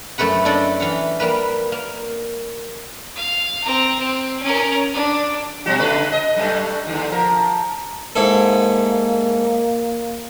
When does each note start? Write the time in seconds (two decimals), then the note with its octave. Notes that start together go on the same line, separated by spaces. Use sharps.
0.18 F#2 A3 A4 B4 F#5
0.45 D4 E4 A4 D5 D#5
0.80 E3 F5 F#5
1.20 G3 A#3 B4
1.72 A#3
3.16 F5
3.63 C4 A#5
3.99 C4
4.43 C#4 A#4
4.93 D4
5.66 B2 G3 F#4
5.79 C#3 A3 B4
6.12 D#5
6.37 F#2 G3 A3
6.87 D#2 D3
7.11 F3 A#4
8.16 G#2 A#3 E4 A4